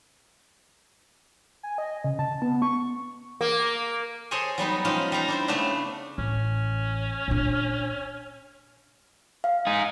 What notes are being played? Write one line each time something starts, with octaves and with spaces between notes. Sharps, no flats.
G#5
D#5
C#3
A5
B3
C#6
A#3
G#4 A4 C5 C#5 D#5 G#5
F#3 G3 B3 D#4
F3 G#3 C#4 D#4 F4 G4
G3 D#4 A#5 C6
D4 E4 C5
C#3 A3 B3 D4 E5
A1 C#4
A#2 D4
F5
D#4 G#4